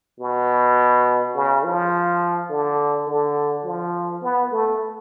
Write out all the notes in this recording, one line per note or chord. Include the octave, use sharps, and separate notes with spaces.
B2
C#3
F3
D3
D3
F3
B3
A3